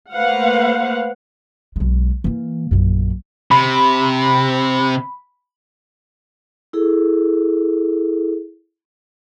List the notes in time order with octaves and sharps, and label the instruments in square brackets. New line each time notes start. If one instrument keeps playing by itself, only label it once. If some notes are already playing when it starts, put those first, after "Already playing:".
[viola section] A3 A#3 B4 C5 F5 F#5
[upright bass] B1 G#3
E3 A#3
A#1 F#2
[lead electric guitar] C3 [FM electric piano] B5
[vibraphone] E4 G#4 A4